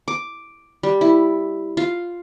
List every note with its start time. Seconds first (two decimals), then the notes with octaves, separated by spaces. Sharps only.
0.08 D6
0.83 G3
1.01 E4
1.77 F4